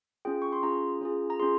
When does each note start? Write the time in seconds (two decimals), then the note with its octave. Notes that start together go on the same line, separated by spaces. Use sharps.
0.25 C#4 F4 G#4 G5
0.42 C#6
0.52 C6
0.63 C#4 F4 G#4 A#5
1.01 C#4 F4 G#4
1.30 A#5
1.40 C#4 F4 G#4 C6